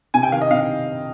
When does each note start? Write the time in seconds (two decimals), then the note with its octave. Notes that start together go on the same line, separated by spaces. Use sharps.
0.14 C3 G#5
0.23 G5
0.32 D#3 F5
0.41 D#5
0.51 C3 F5